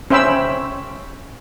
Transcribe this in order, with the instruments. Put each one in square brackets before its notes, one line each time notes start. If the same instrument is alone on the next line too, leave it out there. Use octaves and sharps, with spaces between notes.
[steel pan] C#4 C5 E5 G5 B5 E6